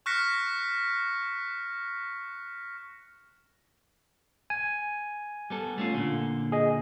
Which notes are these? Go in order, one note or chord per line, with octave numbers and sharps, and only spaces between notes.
C#6 F6 F#6 A#6 B6 C#7
G#5
G3 B3 A4
A3 C#4 F4
A#2 D3
G#4 D#5